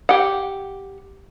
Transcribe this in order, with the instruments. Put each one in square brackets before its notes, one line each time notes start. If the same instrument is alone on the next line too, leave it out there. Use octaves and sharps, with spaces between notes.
[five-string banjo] G4 F#5